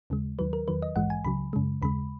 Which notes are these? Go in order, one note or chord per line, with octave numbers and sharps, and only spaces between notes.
D#2 C#3 G#3
D#2 D#3 F#3 B4
A#4
E2 D#3 F#3 B4
D#5
A#1 G#2 E3 G#3 F#5
G#5
C#2 C#3 F#3 B5
F#2 C#3 G#3
D#2 C#3 G#3 B5